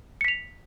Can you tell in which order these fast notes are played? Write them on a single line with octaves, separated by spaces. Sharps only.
C#7 B6 F7